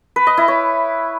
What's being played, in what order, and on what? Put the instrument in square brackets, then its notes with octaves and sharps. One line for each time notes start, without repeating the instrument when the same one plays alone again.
[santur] B4
D#5
E4
C#5